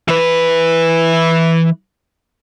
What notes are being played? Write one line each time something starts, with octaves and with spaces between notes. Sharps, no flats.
E3 B4